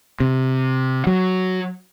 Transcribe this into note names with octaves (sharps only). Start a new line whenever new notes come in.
C3
F#3